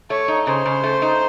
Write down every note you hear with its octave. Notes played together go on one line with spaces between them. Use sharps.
A3 C#5
D#4
C#3 C5
C#3
A3
D#4